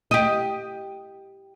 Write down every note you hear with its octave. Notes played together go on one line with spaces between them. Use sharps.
G4 D#5